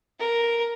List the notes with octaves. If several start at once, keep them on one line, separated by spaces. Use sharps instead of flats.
A#4